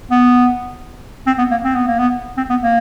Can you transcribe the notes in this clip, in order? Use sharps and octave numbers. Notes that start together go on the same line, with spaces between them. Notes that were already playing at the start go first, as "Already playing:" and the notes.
B3
C4
B3
A#3
C4
B3
A#3
B3
C4
B3
A#3